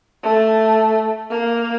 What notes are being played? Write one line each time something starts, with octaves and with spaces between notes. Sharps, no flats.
A3
A#3